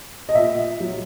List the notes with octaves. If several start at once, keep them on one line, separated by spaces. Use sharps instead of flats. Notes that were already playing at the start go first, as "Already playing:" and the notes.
D#5
A#2 E5
F#3